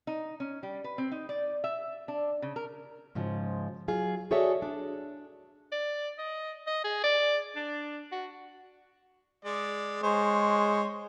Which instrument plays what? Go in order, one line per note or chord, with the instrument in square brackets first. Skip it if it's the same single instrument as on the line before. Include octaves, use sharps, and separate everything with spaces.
[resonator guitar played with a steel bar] D#4
C#4
G3
B4
C4
D#4
D5
E5
D4
C#3
A#4
[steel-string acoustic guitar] G#2 C#3 F3
F#3 F4 G#4
F#4 G#4 A4 C#5 D5 E5
D4
[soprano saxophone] D5
D#5
D#5
G#4
D5
D4
F#4
[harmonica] G#3 D5
[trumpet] G#3 [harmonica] C5 C#5